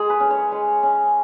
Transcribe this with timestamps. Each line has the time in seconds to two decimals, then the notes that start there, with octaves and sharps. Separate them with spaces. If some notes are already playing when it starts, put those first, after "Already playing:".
Already playing: G#3 G#4
0.10 B4
0.20 C#4
0.31 C#5
0.52 G#3
0.83 C#4